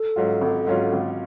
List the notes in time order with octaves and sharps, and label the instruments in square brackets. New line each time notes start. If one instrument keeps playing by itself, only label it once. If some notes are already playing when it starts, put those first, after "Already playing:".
Already playing: [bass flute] A4
[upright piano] G#2 F#3 C#4 F4
G#1
G#2 F#3 C#4 F4
G#1